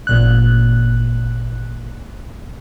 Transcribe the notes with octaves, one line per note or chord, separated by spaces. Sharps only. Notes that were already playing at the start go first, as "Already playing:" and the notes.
G#1 A#2 F#6